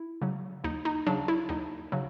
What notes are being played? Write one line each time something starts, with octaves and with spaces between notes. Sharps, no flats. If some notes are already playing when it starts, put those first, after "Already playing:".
Already playing: E4
C#3 F#3
D#2 D#4
D#4
C#3 F#3 D4
E4
D#2 D#4
C#3 F#3